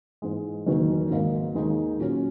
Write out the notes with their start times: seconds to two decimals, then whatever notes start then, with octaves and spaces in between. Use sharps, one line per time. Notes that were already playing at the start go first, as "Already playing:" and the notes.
0.22 G#2 E3 G#3
0.66 F#1 E2 D#3 F#3
1.10 G#1 G#2 F#3 A#3 D#4
1.55 D#2 D#3 G#3 D#4
1.99 A#2 F#3 C#4